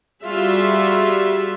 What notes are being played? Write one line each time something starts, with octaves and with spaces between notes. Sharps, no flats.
G3 F4 F#4 G#4 E5